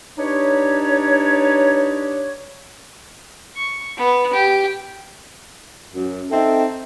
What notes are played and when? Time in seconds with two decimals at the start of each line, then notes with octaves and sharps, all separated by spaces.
0.18 D4 D#4 G4 B4 C#5
3.57 C#6
3.97 B3
4.34 G4
5.94 F#2
6.31 C4 D#4 A4 E5 G5